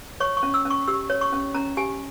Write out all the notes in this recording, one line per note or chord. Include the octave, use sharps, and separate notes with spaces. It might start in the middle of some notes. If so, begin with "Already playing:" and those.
C#5 C#6
C#6
C#4
E6
C#4
C#6
G4 E6
C#5
C#6
C#4
C#4 A#5
G4 G#5